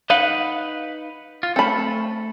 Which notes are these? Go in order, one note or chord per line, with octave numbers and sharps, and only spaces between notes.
D#4 B4 F5 F#5
F4
A3 C4 A4 B5